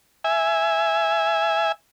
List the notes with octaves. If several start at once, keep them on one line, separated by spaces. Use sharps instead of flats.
E5 G#5